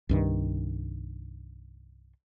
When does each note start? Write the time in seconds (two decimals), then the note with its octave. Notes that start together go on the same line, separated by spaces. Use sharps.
0.09 C2 G2 D#3